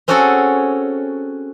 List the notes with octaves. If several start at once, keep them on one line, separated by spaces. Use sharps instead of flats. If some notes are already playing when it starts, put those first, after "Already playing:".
C4 C#4 F#4 G#4 A4 C#5